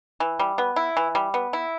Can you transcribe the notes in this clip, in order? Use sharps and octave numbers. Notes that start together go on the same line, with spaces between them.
E3
G3
B3
E4
E3
G3
B3
E4